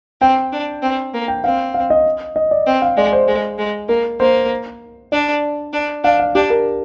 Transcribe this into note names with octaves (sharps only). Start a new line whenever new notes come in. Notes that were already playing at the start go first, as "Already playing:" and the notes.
C4 G5
D4
C4
A#3
G5
C4 F5
F5
D#5
D#5
D5
C4
F5
G#3 D5
C5
G#3
G#3
A#3 A#4
A#3 C5
D4 D5
D4
D4 F5
F5
D4 G4
A#4